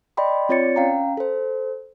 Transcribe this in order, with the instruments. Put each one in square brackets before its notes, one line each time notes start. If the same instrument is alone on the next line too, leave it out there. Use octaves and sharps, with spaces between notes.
[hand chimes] D5 D#5 G5 B5 C6
C4 F4 C#5 D5 A6 C#7
C#4 F5 G5 A#5
A4 C5